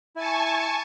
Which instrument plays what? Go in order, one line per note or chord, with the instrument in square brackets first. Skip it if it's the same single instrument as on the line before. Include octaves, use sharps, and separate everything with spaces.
[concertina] E4 [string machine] G#5 A5 C#6